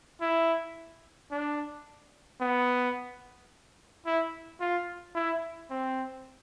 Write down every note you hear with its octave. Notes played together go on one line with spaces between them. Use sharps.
E4
D4
B3
E4
F4
E4
C4